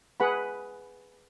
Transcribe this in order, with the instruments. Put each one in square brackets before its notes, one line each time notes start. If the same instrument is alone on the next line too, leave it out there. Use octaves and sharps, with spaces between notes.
[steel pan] G#4 B4 F#5 B5